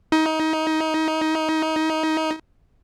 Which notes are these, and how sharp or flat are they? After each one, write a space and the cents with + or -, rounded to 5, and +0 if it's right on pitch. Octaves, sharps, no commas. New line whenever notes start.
D#4 +25